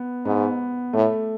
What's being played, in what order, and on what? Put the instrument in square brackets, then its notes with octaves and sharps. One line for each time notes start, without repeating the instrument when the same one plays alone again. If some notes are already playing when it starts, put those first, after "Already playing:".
Already playing: [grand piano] B3
[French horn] G#2 [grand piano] B3
[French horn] A2 [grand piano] A3